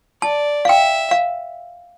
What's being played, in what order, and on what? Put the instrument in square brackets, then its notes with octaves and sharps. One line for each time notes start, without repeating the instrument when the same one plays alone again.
[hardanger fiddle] D5 [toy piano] A5
[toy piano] F5
[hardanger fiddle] E5 [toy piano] G5
[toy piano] F5